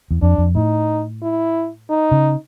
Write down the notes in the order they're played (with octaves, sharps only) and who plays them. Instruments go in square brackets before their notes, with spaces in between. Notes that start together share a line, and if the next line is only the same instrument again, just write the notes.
[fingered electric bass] E2
[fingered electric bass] F2 [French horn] D4
[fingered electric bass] F2
[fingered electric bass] A2 [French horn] D#4
[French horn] E4
D#4
[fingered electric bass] C#3